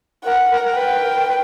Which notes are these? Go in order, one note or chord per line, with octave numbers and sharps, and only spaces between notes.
A#4 F#5
A#4
A#4
B4 G5
A#4
B4